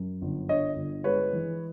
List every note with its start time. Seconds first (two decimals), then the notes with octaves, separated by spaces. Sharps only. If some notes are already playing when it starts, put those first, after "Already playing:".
Already playing: F#2
0.22 G1
0.49 D3 C#5 D#5
0.76 G1
1.04 G#3 B4 C#5
1.33 E3